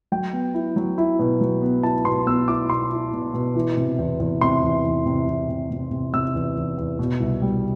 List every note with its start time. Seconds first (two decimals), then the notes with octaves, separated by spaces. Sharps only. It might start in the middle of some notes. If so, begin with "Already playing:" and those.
0.12 F#3 G5
0.33 B3
0.54 E4
0.76 F#3
0.98 E4
1.19 B2
1.41 F#3
1.62 B3
1.83 E4 A5
2.05 B2 C6
2.27 B3 E6
2.48 E4 D6
2.69 B2 C6
2.91 E4
3.12 B2
3.34 B2
3.55 E3
3.77 C3
3.99 E2
4.20 E2
4.41 C3 C6
4.63 E2
4.84 E2
5.06 C3
5.27 E2
5.49 C3
5.71 C3
5.91 C3
6.13 C3 E6
6.35 E2
6.56 E2
6.78 E2
6.99 B2
7.20 C2
7.42 G3